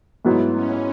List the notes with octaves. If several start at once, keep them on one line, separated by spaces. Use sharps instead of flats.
G#2 F#3 A3 B3 E4
C#4